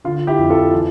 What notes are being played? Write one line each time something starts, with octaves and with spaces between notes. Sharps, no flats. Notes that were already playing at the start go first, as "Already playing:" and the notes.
D3 F4
E4 G4
F2
F4 A4
E3